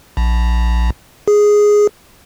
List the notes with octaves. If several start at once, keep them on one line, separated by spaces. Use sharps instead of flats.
A#1
G#4